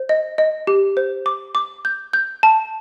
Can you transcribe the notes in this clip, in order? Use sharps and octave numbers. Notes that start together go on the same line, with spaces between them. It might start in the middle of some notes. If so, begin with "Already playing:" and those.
Already playing: C5
D#5
D#5
G4
C5
D6
D6
G6
G6
A5